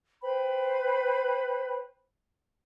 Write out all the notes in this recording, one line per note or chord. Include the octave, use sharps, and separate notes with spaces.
B4 C5 G5 B5